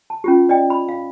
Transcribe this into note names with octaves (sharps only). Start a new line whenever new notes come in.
A5
C#4 F4 G4
D5 D#5 G5
B5
F5